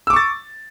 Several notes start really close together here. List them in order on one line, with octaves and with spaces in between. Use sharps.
E6 D6 C#6 A6